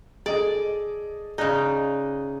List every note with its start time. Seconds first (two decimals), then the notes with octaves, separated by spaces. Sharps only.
0.26 G#4 A4 D5 D#5
1.38 C#3 D#4 G#4 D5 F#6